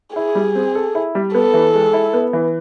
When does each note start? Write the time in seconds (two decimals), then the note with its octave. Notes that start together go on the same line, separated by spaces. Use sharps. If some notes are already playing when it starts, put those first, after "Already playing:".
0.15 E4 G#4
0.35 G3
0.55 C4
0.75 A4
0.95 E4
1.15 G3
1.34 B3 A4
1.54 E3
1.74 G#3
1.93 E4
2.13 B3
2.33 E3